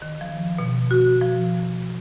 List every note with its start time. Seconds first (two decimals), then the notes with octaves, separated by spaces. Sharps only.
0.02 D#3
0.21 F3
0.58 B2
0.91 F#4
1.21 F3